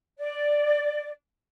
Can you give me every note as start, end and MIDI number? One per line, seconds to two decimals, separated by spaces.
0.18 1.08 74